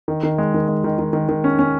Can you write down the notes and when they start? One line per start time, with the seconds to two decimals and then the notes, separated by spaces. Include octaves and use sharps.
0.08 D#3
0.23 D#3
0.38 G#3
0.54 D#3
0.68 G#3
0.84 D#3
0.99 D#3
1.13 D#3
1.29 D#3
1.44 C#4
1.59 C#4